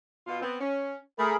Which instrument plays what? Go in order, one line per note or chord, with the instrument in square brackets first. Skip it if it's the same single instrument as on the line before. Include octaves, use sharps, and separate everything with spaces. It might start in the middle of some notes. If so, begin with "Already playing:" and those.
[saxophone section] B2 F4
B3 C4
C#4
[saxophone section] A3 [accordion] G#4 A#4 B5